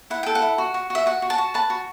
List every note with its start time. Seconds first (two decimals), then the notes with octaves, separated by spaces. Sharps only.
0.10 E4 F#5
0.23 A4 G5
0.35 F#5
0.42 E4
0.58 F#4
0.74 F#4
0.90 F#4 E5
1.06 F#4 F#5
1.22 F#4
1.30 A5
1.38 F#4
1.54 B4 A5
1.70 F#4